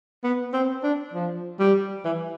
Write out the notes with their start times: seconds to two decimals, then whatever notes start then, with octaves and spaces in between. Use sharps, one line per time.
0.24 B3
0.53 C4
0.83 D4
1.14 F3
1.59 G3
2.05 E3